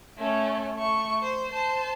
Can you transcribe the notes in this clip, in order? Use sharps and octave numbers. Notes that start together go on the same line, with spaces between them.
A3 C#4
A3 C#6
C5
C5 A5